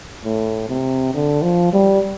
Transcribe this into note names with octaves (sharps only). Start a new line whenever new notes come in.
A2
C3
D3
F3
G3